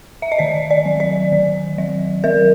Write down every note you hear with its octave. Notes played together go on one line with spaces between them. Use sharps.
E5
D#5
D#3 D5
D5
F#3
D5
D#3
F#3
F#3 A#4